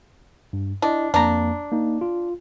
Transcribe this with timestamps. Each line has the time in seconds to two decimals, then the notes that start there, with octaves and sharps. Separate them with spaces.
0.53 G2
0.82 D4 E4 D#5
1.14 F2 A#3 D4 A#5
1.72 A#3 D#4
2.01 F4